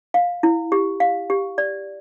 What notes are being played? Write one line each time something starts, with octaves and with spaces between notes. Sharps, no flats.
F5
E4
G4
F5
G4
D5